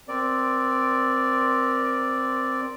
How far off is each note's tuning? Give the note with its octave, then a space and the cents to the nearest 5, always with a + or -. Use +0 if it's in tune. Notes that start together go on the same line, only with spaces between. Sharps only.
C4 +0 A#4 +20 D5 +0